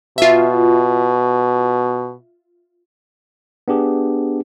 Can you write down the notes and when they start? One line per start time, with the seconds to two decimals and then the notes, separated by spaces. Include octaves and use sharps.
0.18 B2 F4 E5
3.68 B3 D4 G4 G#4